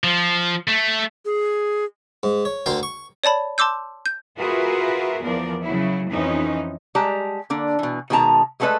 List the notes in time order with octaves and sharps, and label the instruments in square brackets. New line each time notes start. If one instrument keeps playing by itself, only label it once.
[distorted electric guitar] F3
A3
[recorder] G#4
[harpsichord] G#2
C#5
D2 D3 A#4 G5 C6
C#6
[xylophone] C#5 D5 A5 B5
A5 C6 D6 E6 G6
G6
[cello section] F4 F#4 G#4 A#4 B4 E5
E2 F3 A#4 D5
C#3 F#3 E4
F2 E3 C#4 D#4
[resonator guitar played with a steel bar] G3 G#3 G4 A5 A#5
D3 A#3 D4
B2 E3
B2 D#3 G#3 F#5 A5 A#5
G#3 A3 B3 A4 B4 D#5